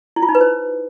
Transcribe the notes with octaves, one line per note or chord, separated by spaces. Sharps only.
E4
F4
D#4
B4
C5